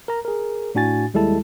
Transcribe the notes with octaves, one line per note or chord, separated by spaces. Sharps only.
A#4 A#5
G#4 A#4
A2 D4 F#4 G#5 A6
D#2 G3 G#3 E4 A4 A5